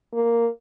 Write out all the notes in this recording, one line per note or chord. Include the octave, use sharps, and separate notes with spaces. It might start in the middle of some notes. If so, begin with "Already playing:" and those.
A#3